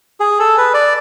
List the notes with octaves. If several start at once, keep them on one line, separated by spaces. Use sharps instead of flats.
G#4
A4
B4
D5